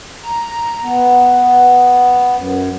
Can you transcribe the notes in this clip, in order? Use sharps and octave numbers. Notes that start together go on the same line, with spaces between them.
A#5
B3
F#2